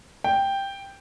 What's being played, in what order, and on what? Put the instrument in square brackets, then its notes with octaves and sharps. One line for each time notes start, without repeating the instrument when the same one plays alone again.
[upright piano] G5